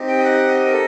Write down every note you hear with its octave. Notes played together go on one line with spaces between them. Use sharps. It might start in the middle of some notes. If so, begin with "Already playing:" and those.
Already playing: C4 D#4 G4
G5
D#5
F#5
D#5
A#4
A4